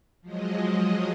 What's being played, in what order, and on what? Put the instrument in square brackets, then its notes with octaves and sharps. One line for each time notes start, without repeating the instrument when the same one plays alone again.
[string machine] F3 F#3 G#3 D#5